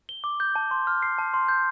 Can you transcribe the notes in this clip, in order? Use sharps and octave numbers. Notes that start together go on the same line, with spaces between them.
G7
D6
G6
A5
C6
F6
C7
A5
C6
G6